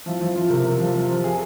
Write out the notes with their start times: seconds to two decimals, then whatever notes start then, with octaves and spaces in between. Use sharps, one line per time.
0.06 F3 E4
0.21 F3
0.36 F3 F4
0.50 C3 A#4
0.65 C3
0.80 F3
0.94 F3
1.09 F3
1.24 G#4